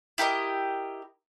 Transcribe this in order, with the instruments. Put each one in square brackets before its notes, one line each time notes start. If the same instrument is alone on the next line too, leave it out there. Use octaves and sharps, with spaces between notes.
[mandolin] E4 G4 A#4 D#5